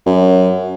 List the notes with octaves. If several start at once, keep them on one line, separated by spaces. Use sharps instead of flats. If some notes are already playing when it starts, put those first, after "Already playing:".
F#2